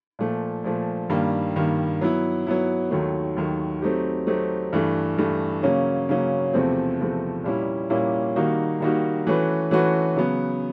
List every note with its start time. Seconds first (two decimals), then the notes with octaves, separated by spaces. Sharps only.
0.19 A#2 F3 A3
0.64 A#2 F3 A3
1.09 G2 D#3 G3 A#3
1.56 G2 D#3 G3 A#3
2.01 F#3 B3 E4
2.47 F#3 B3 E4
2.91 D#2 D#3 F#3 A3
3.36 D#2 D#3 F#3 A3
3.82 F#3 A3 C4 D#4 G4
4.27 F#3 A3 C4 D#4 G4
4.73 G2 E3 A3
5.18 G2 E3 A3
5.63 C#3 F#3 A#3 C#4
6.09 C#3 F#3 A#3 C#4
6.53 E2 C3 F3 A3 C4
7.00 E2 C3 F3 A3 C4
7.44 A#2 G3 A#3 C#4 E4
7.90 A#2 G3 A#3 C#4 E4
8.36 D#3 G3 A#3 D#4 F#4
8.80 D#3 G3 A#3 D#4 F#4
9.27 E3 A3 C#4 F#4 B4
9.71 E3 A3 C#4 F#4 B4
10.16 C#3 F#3 B3